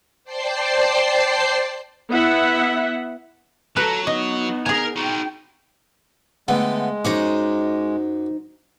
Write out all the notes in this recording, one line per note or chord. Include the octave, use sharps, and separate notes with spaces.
C5 D5 G5 A5 C7
B3 E4 E5 F#5
F#3 A4 B4 A#5
B3 D#4 D#5
G#4 A#4 G#5 A#5
D#4 F#4 G5
D3 G#3 A3 B3 G5
F#2 D#4 C5 C#5 F#5 D6